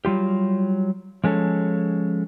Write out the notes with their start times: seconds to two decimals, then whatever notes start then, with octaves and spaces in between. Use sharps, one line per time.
0.05 F#3 G3 F4 G4
1.24 F3 G#3 C#4 A4